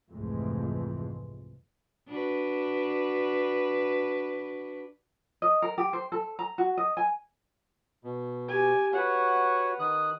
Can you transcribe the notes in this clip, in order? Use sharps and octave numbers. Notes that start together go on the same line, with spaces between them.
C2 F2 G#2 E3 G#3 A3
D4 F#4 B4
D#5
A#4
G4
C5
A4
A#5
F#4
D#5
G#5
B2
G4 G#5
F#4 B4 C#5 F#5
D#3 D#6 F#6